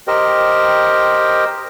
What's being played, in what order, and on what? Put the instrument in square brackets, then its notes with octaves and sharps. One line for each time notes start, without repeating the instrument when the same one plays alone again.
[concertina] G4 A#4 C5 D#5 G5